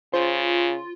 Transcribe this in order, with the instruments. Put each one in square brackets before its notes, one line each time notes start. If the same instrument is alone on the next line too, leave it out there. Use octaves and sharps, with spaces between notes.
[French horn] C#3 [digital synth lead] F4 [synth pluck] C5